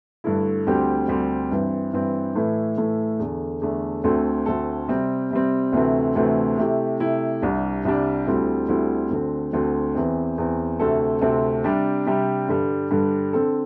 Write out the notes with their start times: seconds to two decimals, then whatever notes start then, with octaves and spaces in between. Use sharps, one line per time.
0.24 G2 D3 A3 E4
0.66 D2 D3 G3 C4 G4
1.08 D2 D3 G3 C4 G4
1.51 G2 E3 C4
1.93 G2 E3 C4
2.36 A2 E3 A3
2.78 A2 E3 A3
3.19 E2 D3 A3
3.61 E2 D3 A3
4.04 D2 D3 A3 C4 A4
4.46 D2 D3 A3 C4 A4
4.88 C3 G3 C4
5.31 C3 G3 C4
5.73 D2 C3 E3 A3 C4
6.15 D2 C3 E3 A3 C4
6.58 C3 A3 E4 G4
7.00 C3 A3 E4 G4
7.42 C2 C3 G3 D4
7.85 C2 C3 G3 D4
8.26 D2 D3 G3 C4 E4
8.68 D2 D3 G3 C4 E4
9.11 D2 D3 C4
9.53 D2 D3 C4
9.95 E2 E3 C4
10.38 E2 E3 C4
10.79 D2 C3 A3 C4 A4
11.21 D2 C3 A3 C4 A4
11.64 C3 G3 D4 G4
12.07 C3 G3 D4 G4
12.48 G2 D3 G3
12.91 G2 D3 G3
13.33 D3 C4 A4